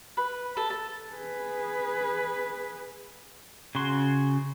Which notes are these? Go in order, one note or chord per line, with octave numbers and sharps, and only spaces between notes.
B4
A4
A4
G#4 B4
C#3 F#4 C6